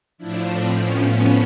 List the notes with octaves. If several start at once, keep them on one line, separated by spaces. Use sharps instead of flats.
A2 F3 D4 E4
C4 D4
B3 C#4
B3 C#4